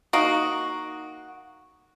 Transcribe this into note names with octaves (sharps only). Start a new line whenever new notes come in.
A#3 D#4 F#4